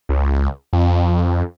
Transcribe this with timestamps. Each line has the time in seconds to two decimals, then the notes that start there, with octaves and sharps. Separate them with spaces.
0.09 C#2
0.73 F2